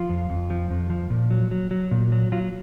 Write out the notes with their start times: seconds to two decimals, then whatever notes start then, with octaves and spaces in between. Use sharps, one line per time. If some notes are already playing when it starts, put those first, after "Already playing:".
Already playing: F3 F4
0.09 F2
0.30 F2
0.50 F3
0.70 F2
0.90 F3
1.10 A#2
1.31 F#3
1.51 F#3
1.71 F#3
1.91 A#2
2.12 F#3
2.32 F#3 F4